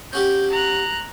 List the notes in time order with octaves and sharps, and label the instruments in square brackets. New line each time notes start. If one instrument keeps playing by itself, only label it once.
[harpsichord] C#4 F#4 G4 [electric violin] G6
[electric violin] A#5 F#6